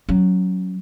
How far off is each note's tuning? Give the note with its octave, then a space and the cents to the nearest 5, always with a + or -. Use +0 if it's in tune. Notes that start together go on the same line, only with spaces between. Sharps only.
F#3 +0 C#4 +0